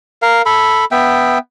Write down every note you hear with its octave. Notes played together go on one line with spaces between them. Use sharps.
A#4 F5
A4 B5
B3 E5 G5